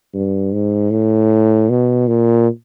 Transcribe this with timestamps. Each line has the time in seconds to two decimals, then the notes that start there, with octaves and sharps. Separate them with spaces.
0.14 G2
0.53 G#2
0.91 A2
1.70 B2
2.08 A#2